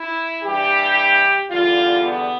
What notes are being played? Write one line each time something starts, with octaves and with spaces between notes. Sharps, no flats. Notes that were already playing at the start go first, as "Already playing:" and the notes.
Already playing: E4
G2 E3 G3 G4
E2 D3 G3 F4
B3